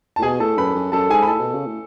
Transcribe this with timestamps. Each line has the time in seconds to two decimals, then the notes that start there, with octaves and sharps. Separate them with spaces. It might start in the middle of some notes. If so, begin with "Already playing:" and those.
0.16 A2 A5
0.22 B2 G#4 G#5
0.40 A2 A4 A5
0.58 F#2 B4 B5
0.75 F#2
0.92 F#2 A4 A5
1.10 G#2 G#4 G#5
1.22 B5
1.27 A2 A4 A5
1.40 B2
1.54 C#3
1.66 A2